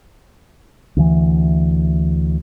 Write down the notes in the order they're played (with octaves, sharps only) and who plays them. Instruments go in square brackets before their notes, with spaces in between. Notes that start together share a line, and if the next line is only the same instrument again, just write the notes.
[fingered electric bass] D2 E3